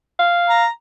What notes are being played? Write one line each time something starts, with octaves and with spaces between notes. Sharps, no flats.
F5
A#5